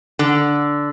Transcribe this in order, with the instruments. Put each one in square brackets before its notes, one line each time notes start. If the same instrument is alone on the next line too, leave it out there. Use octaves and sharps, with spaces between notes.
[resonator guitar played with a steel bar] D3